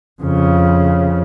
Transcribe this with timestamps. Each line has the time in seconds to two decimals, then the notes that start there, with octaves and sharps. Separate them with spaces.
0.22 F2 C#3